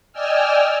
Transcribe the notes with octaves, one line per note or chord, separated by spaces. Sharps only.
D5 D#5 G5 G#5 E6 F6